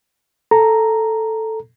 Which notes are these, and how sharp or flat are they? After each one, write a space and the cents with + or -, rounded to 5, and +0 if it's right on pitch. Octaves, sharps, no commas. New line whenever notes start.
A4 +0 A#5 +0